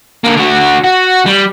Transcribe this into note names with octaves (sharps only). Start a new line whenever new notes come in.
D3 A#3
D3 F#4
F#4
G3